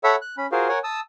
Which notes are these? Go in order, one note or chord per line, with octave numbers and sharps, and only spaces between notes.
A4 C#5 E5 F#5 B5 E6
F#6
C#4 B5
F4 F#4 G#4 A#4 C5 F5
A#4 C#5 F#5 G#5
A5 D#6 E6